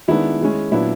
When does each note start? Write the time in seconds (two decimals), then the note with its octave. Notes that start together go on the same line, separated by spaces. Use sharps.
0.08 D#3 G#3 B3 D4 E4
0.41 D#3 G#3 C#4
0.71 A#2 F#3 B3 D4 E4